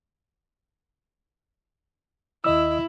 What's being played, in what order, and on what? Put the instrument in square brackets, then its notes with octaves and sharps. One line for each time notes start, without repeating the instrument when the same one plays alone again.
[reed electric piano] D#2 D#5 E6 [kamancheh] E4